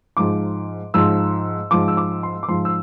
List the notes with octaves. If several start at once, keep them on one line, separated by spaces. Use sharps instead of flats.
G#2 F3 D6
G#2 F3 E6
G#2 F3 D6
E6
D6
C6
D6
G#2 F3 C6
E6